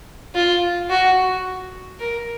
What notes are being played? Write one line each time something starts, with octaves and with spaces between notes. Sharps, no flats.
F4
F#4
A#4